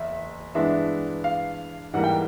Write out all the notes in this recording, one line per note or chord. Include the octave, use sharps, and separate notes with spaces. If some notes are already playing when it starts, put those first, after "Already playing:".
Already playing: F#1 E2 E5
G2 E3 G#3 B3 D4 E5
F5
G#2 E3 G3 A#3 F#5
G5